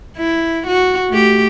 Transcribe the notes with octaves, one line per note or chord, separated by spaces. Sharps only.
E4
F#4
A3 G4